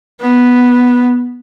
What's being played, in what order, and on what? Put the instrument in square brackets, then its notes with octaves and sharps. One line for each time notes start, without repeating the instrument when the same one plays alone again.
[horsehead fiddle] B3